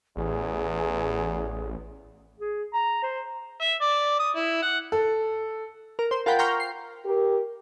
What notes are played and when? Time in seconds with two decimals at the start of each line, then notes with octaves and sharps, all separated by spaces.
0.17 A1 E2 G#4
2.39 G#4
2.74 A#5
3.03 C5
3.61 E5
3.82 D5
4.19 D#6
4.36 E4
4.62 F#5
4.92 A4
5.99 A#4
6.11 C5
6.26 F4 A#4 F#5 G5 B5
6.39 G5 A#5 C6 C#6 F6 G6
6.60 C7
7.05 G4 A#4